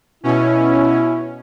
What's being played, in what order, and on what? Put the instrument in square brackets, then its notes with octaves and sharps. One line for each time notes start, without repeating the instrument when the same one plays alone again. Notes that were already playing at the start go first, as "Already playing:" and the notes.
[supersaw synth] B2 C#4 [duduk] E4